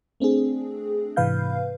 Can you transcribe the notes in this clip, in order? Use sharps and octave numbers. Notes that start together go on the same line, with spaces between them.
A3 C4 D4 G#4
G#2 C3 E3 B4 F5 G6